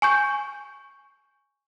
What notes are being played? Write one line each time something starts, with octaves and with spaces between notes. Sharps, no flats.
G#5 C#6 G6